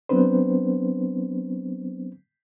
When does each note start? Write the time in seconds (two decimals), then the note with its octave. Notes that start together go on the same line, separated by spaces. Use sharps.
0.09 F#3 B3 C4 D4 B4 C5